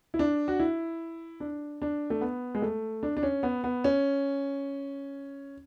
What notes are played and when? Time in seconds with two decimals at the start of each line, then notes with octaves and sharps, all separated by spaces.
0.14 E4
0.19 D4
0.48 F#4
0.60 E4
1.40 D4
1.82 D4
2.10 A3
2.21 B3
2.55 G#3
2.62 A3
3.03 D4
3.17 D4
3.23 C#4
3.43 B3
3.64 B3
3.84 C#4